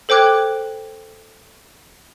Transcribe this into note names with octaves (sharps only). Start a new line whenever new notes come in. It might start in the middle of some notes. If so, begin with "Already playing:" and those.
A4 C5 G5 D6 F#6 G#6